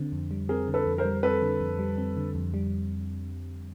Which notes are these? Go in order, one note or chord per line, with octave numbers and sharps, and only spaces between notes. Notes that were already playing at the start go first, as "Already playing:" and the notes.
Already playing: D3 C4
F2
G3
C4 G#4 A#4
D3
A4 B4
F2
A#4 C5
G3
C4 A4 B4
D3
F2
G3
C4
D3
F2
G3